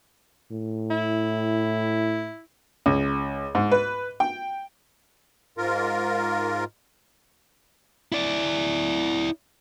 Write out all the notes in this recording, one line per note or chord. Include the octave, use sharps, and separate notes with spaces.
A2
E4
C#2
G#2
B4
G5
G#2 F4 A#4
E4 D5